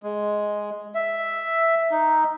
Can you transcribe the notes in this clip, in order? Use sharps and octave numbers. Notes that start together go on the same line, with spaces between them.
G#3
E5
D#4